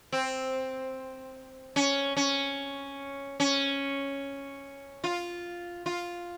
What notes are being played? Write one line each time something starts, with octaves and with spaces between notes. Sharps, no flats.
C4
C#4
C#4
C#4
F4
F4